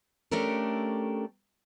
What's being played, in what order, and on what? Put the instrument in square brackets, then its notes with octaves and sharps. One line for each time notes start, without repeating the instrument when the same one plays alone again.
[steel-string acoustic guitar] A3 C#4 D4 G4 A4 A#4